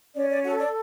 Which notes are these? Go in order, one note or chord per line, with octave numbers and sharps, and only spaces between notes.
C#4 D5
D5
F#4 A4 F#5
D5